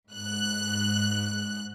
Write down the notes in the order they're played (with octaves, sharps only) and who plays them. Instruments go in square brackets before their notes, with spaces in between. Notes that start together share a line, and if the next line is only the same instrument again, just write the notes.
[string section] G#2 F#6